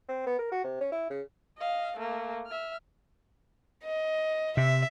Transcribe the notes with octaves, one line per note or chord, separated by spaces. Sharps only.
C4
B3
A#4
F#4
C3
C#4
E4
C#3
D#5 F5
A3 A#3
E5 F6
D#5
C3 E5